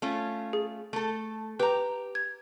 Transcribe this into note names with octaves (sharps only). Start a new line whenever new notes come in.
A3 C#4 F4
G#4
A3 A4
G4 B4 A#5
G#6